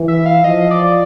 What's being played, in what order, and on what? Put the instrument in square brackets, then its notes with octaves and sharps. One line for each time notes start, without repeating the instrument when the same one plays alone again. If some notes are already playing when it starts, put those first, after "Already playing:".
Already playing: [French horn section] E3
[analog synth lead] E5
F5
[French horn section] F3 [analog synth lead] D#5
[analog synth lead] D5